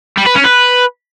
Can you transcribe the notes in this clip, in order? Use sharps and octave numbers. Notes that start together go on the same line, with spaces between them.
G3
B4
C#4
B4